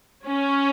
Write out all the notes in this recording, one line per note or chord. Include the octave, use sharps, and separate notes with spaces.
C#4